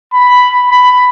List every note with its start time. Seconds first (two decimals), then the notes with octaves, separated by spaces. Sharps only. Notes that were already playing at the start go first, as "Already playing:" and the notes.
0.13 B5
0.70 B5